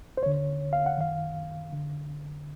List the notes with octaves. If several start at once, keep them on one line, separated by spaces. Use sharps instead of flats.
C5
D#2 D3 C#5
F5
F#5
F#2 D#3 F5
F2 D3